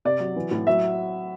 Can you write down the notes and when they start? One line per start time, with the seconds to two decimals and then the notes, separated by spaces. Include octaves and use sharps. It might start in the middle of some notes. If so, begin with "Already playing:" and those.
0.05 C3 D5
0.20 F#3
0.36 E3
0.51 A2
0.67 F#3 E5